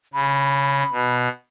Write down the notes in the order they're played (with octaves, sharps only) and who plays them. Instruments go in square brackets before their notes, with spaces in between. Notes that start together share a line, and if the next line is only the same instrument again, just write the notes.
[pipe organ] C#3 [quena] B5
[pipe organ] B2